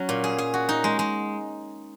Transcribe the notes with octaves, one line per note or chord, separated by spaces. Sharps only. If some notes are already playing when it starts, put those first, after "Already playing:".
Already playing: F#3 C#4
A#2
G#4
G#4
F#4
D#4
G#3
G#3